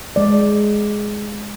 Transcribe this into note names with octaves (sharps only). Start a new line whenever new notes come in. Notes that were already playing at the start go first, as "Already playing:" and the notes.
G#3 D5